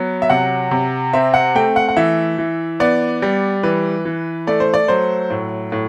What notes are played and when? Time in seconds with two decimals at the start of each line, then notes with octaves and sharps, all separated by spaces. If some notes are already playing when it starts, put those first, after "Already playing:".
Already playing: F#3 B3
0.22 E5
0.30 C3 F#5
0.71 C3
1.13 C4 E5
1.34 F#5
1.55 A3 G5
1.76 F#5
1.89 F#5
1.97 E3 E5
2.38 E3
2.80 B3 D5
3.22 G3
3.63 E3 B4
4.05 E3
4.47 A3 D5
4.60 C5
4.74 D5
4.88 F#3 C5
5.30 A2
5.72 A2